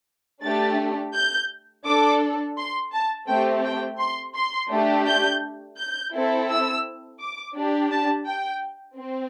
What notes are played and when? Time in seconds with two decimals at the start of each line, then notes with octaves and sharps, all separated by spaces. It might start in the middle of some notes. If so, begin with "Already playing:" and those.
0.43 A3 D4 G4 A6
1.15 G6
1.86 D4 A4 D6
2.58 C6
2.92 A5
3.28 A3 C4 G4 G5
3.64 G5
3.99 C6
4.35 C6
4.71 A3 D4 G4
5.06 G6
5.77 G6
6.13 C4 E4 A4
6.49 E6
7.20 D6
7.55 D4 G4
7.91 A5
8.27 G5
8.98 C4